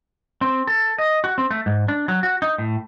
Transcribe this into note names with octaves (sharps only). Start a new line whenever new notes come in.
C4
A4
D#5
F#4
C4
A3
G#2
D4
F#3
F#4
D#4
A2